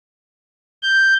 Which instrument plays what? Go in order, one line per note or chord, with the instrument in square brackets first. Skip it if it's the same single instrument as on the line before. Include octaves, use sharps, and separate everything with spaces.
[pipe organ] G6